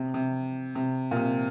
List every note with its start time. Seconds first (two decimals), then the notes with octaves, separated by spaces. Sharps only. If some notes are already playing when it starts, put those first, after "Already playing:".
Already playing: C3
0.14 C3
0.75 C3
1.11 A#2
1.17 C3